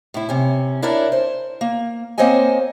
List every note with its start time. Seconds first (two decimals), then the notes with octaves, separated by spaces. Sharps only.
0.14 A2 E4
0.29 C3 C#4
0.82 D4 E4 A#4 C#5 D5 E5
1.12 C5
1.61 A#3
2.18 A#3 C4 C5 C#5 D#5 G#5